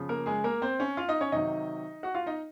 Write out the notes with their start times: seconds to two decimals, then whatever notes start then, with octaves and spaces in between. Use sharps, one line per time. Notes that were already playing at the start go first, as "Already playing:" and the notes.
Already playing: C#3 F3
0.09 A#3 A#4
0.26 G#3 G#4
0.44 A#3 A#4
0.62 C4 C5
0.79 C#4 C#5
0.97 F4 F5
1.08 D#4 D#5
1.21 C#4 C#5
1.32 C3 D#3 F#3 D#4 D#5
2.03 F#4 F#5
2.14 F4 F5
2.26 D#4 D#5